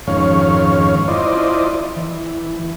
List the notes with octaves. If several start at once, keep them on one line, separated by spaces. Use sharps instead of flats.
F2 G#2 D#3 C#4 C#5 F5
E4 F4 C5 D5 D#5
E3